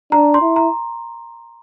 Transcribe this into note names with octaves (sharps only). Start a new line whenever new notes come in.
D4 A#5
C6
E4
A#5